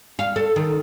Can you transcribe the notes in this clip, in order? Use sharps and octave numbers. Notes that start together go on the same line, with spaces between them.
F5
A4
D#3